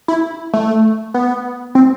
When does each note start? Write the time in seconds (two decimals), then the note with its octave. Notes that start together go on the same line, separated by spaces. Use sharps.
0.08 E4
0.53 A3
1.14 B3
1.75 C4